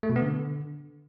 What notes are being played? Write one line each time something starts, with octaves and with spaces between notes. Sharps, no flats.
A3
B2
B3
D3